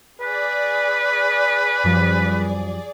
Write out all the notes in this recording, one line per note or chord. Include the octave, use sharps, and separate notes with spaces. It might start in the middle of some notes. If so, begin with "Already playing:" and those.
G#4 B4 D5
F#2 F3 G3